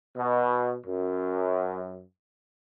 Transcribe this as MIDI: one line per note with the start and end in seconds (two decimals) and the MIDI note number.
0.17 0.75 47
0.87 2.02 42